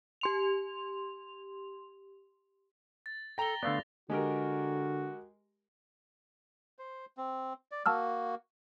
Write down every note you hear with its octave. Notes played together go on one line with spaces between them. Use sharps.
G4 C6 F7
A6
A4 G5 A#5 A#6 F7 G7
D3 A3 B3 D5 F5
D3 G#3 F#4 G4 A#4
C5
C4
D5
A#3 F#4 A5 E6 F6